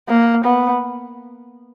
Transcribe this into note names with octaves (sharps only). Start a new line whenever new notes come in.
A#3
B3